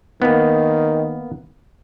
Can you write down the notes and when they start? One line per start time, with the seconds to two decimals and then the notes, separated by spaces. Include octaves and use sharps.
0.22 D#3 A#3 B3